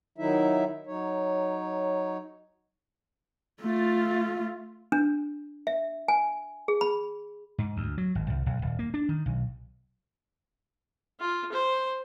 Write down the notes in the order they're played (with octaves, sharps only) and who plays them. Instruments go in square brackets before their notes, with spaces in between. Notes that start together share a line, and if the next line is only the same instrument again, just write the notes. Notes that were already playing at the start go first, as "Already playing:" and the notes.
[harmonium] D#3 F#3 D#4 E4 E5
F#3 D#4 C#5
[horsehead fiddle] A3 F4
[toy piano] D4
E5
G#5
G#4
B5
[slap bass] G#2
D2
F#3
G#1
C2
B1
D#1
A#3
D4
D#3
B1
[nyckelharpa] F4
C5